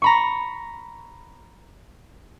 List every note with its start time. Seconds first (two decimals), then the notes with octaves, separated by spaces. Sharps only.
0.02 A#5 B5 C#6